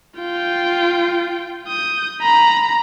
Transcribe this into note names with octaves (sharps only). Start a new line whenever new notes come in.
F4 G5
D#6 G6
A#5 B5